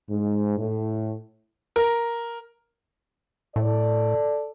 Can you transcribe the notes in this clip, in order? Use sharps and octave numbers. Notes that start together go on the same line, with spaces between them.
G#2
A2
A#4
A2 A4 D5